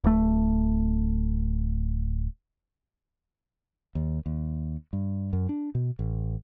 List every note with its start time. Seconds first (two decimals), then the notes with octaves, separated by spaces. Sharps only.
0.04 D1 A3
3.95 D#2
4.26 D#2
4.93 G2
5.33 F#2
5.49 D4
5.75 B2
5.99 A1